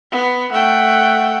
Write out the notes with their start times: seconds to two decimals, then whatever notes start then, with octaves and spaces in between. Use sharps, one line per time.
0.12 B3
0.52 A3 F#5 G5